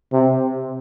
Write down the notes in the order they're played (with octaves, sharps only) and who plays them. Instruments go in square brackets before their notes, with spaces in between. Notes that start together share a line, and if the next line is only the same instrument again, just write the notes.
[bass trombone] C3